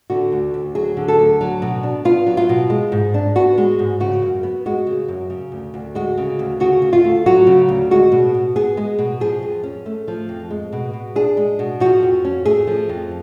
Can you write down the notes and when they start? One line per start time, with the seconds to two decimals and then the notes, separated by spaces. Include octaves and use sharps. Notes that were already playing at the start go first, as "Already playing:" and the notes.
0.10 D3 F#4
0.32 D2
0.54 D2
0.75 F#3 G#4
0.97 D3
1.08 A4
1.19 D2
1.41 F#3
1.62 B2
1.83 D4
2.05 B3 F4
2.27 F#3
2.37 F4
2.49 B2
2.70 G#3
2.92 G#2
3.14 D4
3.36 B3 F#4
3.58 G#3
3.79 G#2
4.00 C#3 F#4
4.22 F#2
4.43 B3
4.66 G#3 F#4
4.87 C#3
5.08 F#2
5.30 C#3
5.52 D2
5.74 D2
5.95 G#3 F#4
6.18 C#3
6.39 D2
6.60 C#3 F#4
6.82 D2
6.93 F4
7.04 A3
7.26 F#3 F#4
7.47 C#3
7.68 D2
7.91 G#3 F#4
8.12 B2
8.34 B2
8.56 B3 G#4
8.77 G#3
8.99 B2
9.20 F3 G#4
9.43 F2
9.64 C#4
9.86 A3
10.08 F3
10.29 F2
10.50 G#3
10.73 B2
10.93 B2
11.16 D4 G#4
11.37 G#3
11.59 B2
11.80 F3 F#4
12.03 F2
12.25 C#4
12.45 A3 G#4
12.67 F3
12.89 F2